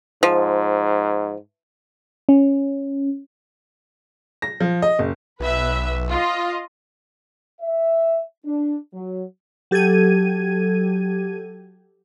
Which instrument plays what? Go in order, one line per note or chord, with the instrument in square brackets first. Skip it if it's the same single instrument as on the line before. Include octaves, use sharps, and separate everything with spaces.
[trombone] G#2 [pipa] F3
[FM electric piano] C#4
[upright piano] A#6
F3
D#5
F#1
[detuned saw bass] B1 [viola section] B4 E5
[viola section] F4 D#5
[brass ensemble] E5
D4
F#3
[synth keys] F#3 G4 A4 G#6 D#7